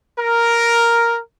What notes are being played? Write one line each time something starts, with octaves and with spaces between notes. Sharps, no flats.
A#4